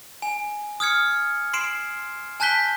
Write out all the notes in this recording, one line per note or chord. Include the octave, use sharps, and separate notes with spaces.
G#5
D#6 F6 G#6 C#7
C6 C7 D7 E7
G#5 A5 F#6 G6 B6 G7